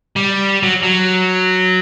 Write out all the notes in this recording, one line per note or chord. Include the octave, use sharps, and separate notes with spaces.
G3
F#3
F#3